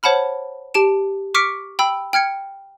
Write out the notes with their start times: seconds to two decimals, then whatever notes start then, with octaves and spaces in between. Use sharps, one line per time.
0.03 C5 C#5 F#5 A5 B5 F6
0.74 G4 A5 D7 E7
1.34 C#6 D6 F6 B6 C#7 D7
1.79 G5 B5 E6
2.13 G5 F6 G#6 C#7